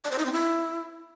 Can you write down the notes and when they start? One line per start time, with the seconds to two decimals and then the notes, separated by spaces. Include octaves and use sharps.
0.04 D5
0.11 C5
0.18 D#4
0.25 C4
0.32 E4